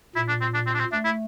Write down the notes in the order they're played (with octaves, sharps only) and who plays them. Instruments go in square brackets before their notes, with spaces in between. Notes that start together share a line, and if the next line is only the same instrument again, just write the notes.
[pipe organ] A#2 [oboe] E4
[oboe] D4
C4
D4
C4
D4
C4
[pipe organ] A3 [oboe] D4
[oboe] E4